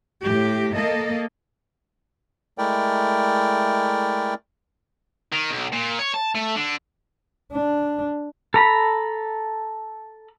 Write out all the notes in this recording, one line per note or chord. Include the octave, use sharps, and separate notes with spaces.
A2 G4
A#3 A4 D#5
G#3 A3 E4 A#4 D5 G5
D#3
B1
A#2
C#5
A5
A3
D3
D4
A4 A#5 B5